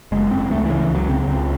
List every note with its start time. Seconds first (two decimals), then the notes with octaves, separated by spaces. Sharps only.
0.12 F#1 G#3
0.31 F#1 C4
0.50 C#2 A3
0.65 C#3 E3
0.79 E3
0.90 C#2
0.95 F#3
1.09 C#3 C4
1.28 C#2 C4